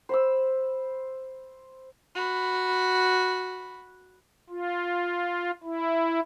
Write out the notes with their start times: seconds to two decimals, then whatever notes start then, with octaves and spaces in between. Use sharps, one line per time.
0.09 C5 B5 E6
2.15 F#4 B5
4.50 F4
5.63 E4